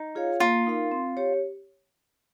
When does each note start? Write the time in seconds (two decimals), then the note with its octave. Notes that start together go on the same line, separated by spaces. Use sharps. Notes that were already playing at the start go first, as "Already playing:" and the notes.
Already playing: D#4
0.15 F4 G#4 C#5 F5
0.40 A#3 F4
0.67 D#4 A#4 F5
0.91 C4
1.17 G4 C#5